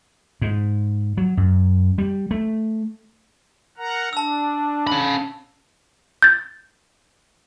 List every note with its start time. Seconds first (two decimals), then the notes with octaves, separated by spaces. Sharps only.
0.41 G#2
1.17 F#3
1.37 F#2
1.98 G3
2.31 A3
3.77 A#4 F#5 A#5
4.13 D4 A5 E6
4.87 C#4 B5
6.22 G6 A6